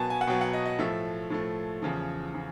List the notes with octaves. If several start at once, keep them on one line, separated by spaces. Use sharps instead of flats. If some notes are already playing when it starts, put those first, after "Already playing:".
Already playing: B2 F#3 B3 G#5 A5
G#5
F#5
B2 F#3 B3 G5
F#5
D#5
D#5
A2 F3 A3 E5
A2 F3 A3
E2 C#3 F3
C#3 F3